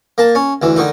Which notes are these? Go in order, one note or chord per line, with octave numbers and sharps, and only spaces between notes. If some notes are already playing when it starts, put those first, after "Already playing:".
A#3 A5
C#4
D2 E3
D3 D#3 D#4